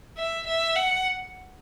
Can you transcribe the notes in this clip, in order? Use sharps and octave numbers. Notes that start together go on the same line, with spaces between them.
E5
E5
F#5